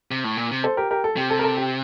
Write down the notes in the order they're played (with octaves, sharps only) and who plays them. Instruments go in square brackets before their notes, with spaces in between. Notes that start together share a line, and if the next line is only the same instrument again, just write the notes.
[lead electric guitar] C3
A2
A#2
C3
[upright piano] A4 C5
G4 A#4
G4 A#4
A4
[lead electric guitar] C3 [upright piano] G4
[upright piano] A4
A#4
A4
G4